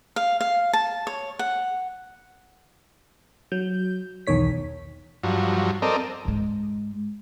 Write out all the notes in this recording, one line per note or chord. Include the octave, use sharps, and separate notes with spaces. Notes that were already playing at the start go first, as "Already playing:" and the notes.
F5
F5
A5
C#5
F#5
F#3 G6
B1 E2 D#3 C#5 B6
G2 F3 F#3
C4 A4 A#4 D5 D#5
G#2 G#3